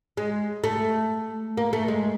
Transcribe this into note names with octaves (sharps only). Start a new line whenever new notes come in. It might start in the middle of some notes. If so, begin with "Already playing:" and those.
G#3
A3
A#3
A3
G#3